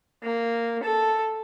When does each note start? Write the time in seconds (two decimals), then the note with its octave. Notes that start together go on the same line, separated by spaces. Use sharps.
0.24 A#3
0.83 A4